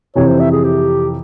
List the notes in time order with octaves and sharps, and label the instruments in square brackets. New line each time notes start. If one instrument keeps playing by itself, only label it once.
[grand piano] F2 C3 E3 [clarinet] C#5
[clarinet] C5
E5
G#4
G4